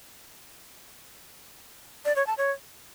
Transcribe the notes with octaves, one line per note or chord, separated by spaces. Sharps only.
D5
C#5
A5
C#5